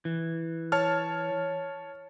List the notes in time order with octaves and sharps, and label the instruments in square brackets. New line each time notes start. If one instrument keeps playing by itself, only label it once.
[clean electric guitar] E3
[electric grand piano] C#5 A5 F6